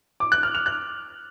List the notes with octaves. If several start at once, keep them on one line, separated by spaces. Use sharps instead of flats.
D6
F#6
F6
F7
F#6